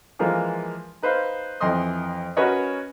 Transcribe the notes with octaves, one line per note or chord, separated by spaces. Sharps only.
E3 F3 G#3 A#3 F4
D#4 B4 C5 F5
F2 E3 D#5 C6 D#6
C#4 F#4 A#4 B4 C#5 D#5